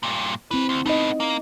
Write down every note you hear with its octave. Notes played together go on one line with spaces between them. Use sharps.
G2 A#2
G#3 C4 E4 B4
D2
A3 B3 D#4 D#5
A#3